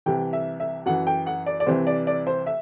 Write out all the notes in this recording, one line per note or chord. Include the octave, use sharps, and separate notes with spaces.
C2 C3 E3 G5
E5
E5
F#2 E3 F#5
G5
F#5
D5
D5
C2 C3 E3 C5
D5
D5
C5
E5